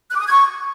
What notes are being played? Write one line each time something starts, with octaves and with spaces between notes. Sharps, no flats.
F#6
D6
D#6
G#6
C#6